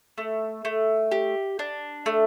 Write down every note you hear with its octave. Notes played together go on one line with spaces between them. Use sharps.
A3
A3
G4
D4
A3